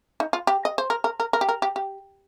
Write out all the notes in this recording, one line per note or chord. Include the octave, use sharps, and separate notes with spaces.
D#4
F4
G4
D#5
C5
A#4
A#4
A#4
A#4
G4
A#4
G4
G4